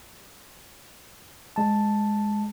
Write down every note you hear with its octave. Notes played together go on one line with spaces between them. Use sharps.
G#3 A5